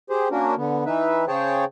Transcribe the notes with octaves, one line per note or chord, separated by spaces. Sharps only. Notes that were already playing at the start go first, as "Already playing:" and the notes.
G4 G#4 C5
A#3 C#4 D4 F#4 A#4
D3 B3
E3 D#4 B4 E5
C#3 G#4 C5 C#5 G5 A5